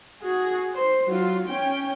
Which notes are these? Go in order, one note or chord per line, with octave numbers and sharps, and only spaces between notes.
F#4 G#4
C5
F#3 F4
C#4 G5